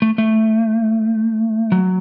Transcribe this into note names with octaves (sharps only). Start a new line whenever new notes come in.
A3
A3
F#3